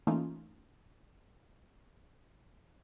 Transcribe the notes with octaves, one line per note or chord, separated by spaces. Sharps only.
E3 A3 A#3 C#4 D#4 F4